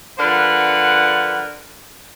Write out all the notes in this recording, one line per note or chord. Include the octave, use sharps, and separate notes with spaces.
D3 F3 D4 A#4 B4 F#5